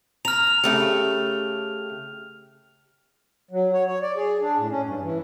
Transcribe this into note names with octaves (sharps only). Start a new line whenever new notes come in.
A#5 F6 F7
C#3 A3 G4
F#3
C#5
C#5
D5
G#4
D4
A2
C#4
G2
E3